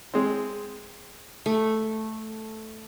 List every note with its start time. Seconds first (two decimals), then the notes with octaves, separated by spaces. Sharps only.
0.14 G#3 C4
1.46 A3